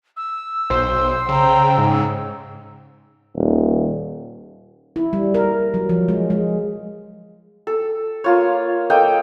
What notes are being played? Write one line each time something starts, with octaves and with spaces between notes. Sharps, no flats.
E6
B1 C5
C#3 G5 A#5
G#2
D#1
E4
G3
A#4
F#3
F3
G#3
G#3
A4
A#3 F4 C#5
A#3 A4 D#5 G5